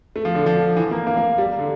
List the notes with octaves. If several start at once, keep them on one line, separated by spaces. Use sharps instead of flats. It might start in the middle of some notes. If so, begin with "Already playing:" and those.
A3
F3
D3
F3
E3
A#3
A#3
A#3
G3
D3